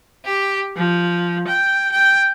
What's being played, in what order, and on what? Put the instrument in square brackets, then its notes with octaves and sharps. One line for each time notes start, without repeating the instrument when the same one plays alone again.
[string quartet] G4
F3
G5
G5